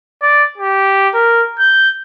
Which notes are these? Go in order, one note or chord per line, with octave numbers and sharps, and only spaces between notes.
D5
G4
A#4
G6